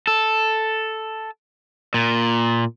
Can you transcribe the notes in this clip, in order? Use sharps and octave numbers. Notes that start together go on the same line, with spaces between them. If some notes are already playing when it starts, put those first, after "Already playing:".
A4
A#2